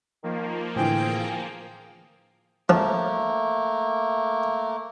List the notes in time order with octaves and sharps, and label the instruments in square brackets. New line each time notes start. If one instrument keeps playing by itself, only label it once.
[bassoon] D#3 [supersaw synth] F3 A#3
[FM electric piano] A2 D3 E3 [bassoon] C4 [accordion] G#4 G5
[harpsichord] F3 [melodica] A3 A#3